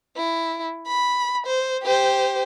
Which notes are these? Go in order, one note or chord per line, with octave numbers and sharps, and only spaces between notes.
E4
B5
C5
G4 C5